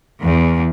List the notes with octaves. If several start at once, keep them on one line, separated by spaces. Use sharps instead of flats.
E2